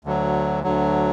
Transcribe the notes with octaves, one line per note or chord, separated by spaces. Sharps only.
D2 D3 F#3
D2 D3 F#3